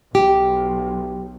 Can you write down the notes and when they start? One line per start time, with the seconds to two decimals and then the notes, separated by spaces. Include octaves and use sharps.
0.15 B1 G4